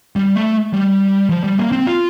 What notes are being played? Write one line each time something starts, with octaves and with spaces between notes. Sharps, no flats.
G3
A3
G3
F3
G3
A#3
C4
F4